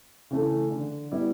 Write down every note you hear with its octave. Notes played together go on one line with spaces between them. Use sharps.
C#3 E3 A3
D3
G3 B3 E4